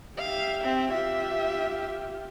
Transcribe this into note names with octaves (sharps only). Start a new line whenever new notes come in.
G4 E5 F5
C4
F4 G4 E5